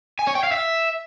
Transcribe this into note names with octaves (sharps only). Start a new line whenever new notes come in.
G#5
C#5
G5
F5
E5